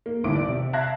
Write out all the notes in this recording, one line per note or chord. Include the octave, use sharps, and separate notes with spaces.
A#3
G1 D#2 A2 D6 D7
D5
C3
E5 F5 A5 F#6 G#6 A#6